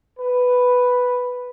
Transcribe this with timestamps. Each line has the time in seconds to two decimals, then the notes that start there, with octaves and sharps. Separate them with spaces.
0.19 B4